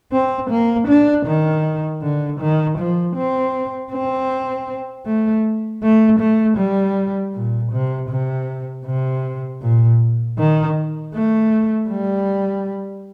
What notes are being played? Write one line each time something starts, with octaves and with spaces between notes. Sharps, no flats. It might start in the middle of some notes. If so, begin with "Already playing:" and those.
C4
A#3
D4
D#3
D3
D#3
F3
C4
C4
A3
A3
A3
G3
A#2
C3
C3
C3
A#2
D#3
A3
G3